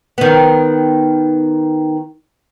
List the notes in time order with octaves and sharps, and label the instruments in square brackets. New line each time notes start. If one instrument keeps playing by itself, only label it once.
[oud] D#3 B3